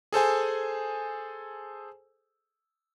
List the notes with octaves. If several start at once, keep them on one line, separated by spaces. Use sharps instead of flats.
G#4 A4 C5 G#5